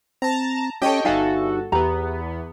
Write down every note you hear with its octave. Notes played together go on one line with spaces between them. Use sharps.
C4 A5 A#5
C#4 G4 A4 C#5 D#5 G5
G1 D#4 F#4 A4 E5 F5 G#5
E2 B3 G4 A#5